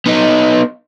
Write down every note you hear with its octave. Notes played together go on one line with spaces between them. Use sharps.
B3 D#4